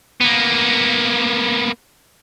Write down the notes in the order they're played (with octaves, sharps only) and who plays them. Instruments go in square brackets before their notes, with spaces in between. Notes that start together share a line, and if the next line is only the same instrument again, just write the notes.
[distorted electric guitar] A#3 B3